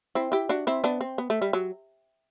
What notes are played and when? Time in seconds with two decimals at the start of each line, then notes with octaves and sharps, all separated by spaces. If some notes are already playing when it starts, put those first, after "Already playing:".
0.15 C4 E4
0.32 E4 G4
0.49 D4 F#4
0.67 C4 E4
0.84 B3 D4
1.01 C4
1.18 B3
1.30 A3
1.42 G3
1.53 F#3